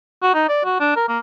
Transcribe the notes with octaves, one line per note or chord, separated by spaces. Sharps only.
F#4
D#4
D5
F#4
D4
A#4
A#3